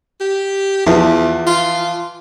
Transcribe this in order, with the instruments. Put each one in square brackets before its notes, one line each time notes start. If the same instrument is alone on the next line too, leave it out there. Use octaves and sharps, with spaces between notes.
[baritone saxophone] G4
[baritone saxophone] E2 [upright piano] E3 F3
[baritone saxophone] F4